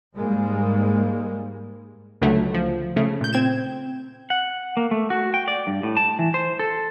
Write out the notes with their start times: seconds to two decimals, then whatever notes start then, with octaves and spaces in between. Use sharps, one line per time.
0.15 G#2 G3 G#3 A#3
2.22 C#2 D3 F#3 A3
2.54 F3
2.96 C#3 A3
3.21 A#2 G6
3.33 C4 G#6 E7
4.30 F#5
4.77 A#3
4.91 A3
5.10 F#4
5.34 G5
5.48 D5
5.67 G2
5.83 A2
5.97 A5
6.19 E3
6.34 C5
6.59 A4